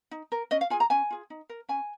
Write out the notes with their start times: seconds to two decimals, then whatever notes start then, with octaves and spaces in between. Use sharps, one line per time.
0.11 D#4
0.32 A#4
0.51 C#4 D#5
0.61 F5
0.70 F4 G#4 G#5
0.80 A#5
0.90 C#4 G#5
1.10 F4 G#4
1.30 D#4
1.49 A#4
1.69 C#4 G#5